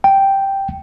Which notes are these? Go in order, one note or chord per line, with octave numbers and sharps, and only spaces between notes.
G5